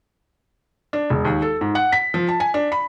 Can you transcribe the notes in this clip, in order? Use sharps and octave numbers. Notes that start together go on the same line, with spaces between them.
D4
E1
D#2
A4
G#2
F#5
B6
F3
A5
G#5
D4
B5